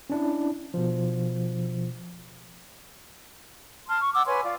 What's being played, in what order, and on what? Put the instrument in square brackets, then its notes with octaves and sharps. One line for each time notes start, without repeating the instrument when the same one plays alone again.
[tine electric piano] C#4 D4 E4
B2 F3
[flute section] A5 C6 F6
C#6
F#5 D6 E6
B4 C#5 G#5 C6
F4 D5